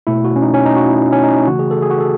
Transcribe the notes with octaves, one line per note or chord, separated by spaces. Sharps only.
B2 A3 E4
F#4
C#4
D#4
C#4
D#4
F#4
E4
C#4
D#4
E4
C#3 E3 A3 F#4
G#4
A4
G#4
F#4
A4